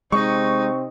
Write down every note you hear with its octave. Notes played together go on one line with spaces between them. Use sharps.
C3 G#3 C4 D#4 C#6